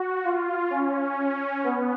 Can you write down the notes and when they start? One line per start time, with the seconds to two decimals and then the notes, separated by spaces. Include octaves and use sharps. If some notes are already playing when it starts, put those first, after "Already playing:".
Already playing: F#4
0.24 F4
0.71 C#4
1.64 B3